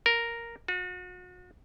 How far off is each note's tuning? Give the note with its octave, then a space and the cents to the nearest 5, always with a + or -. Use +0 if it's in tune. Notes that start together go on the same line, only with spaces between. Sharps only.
A#4 +0
F#4 -40